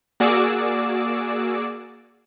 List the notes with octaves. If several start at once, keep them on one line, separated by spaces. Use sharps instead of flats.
A#3 F#4 G#4 D5 D6 E6